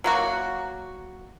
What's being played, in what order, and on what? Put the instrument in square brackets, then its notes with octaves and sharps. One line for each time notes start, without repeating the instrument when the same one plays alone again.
[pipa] F#3 A#3 F#4